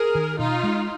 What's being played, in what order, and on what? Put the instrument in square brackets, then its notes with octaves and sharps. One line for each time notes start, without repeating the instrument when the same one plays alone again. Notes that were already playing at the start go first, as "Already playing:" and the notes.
Already playing: [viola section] G#4 A#4
[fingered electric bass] D#3
[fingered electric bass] B2 [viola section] D#4 F4
[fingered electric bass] G#3